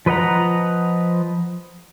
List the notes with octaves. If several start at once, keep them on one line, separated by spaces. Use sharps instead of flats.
F3 B4 D#5 F#5 A#5